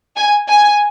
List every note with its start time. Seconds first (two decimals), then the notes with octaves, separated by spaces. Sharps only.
0.17 G#5
0.49 G#5